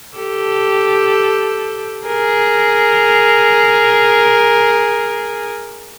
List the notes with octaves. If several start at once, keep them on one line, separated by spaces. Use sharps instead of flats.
G4 A4
G#4 A#4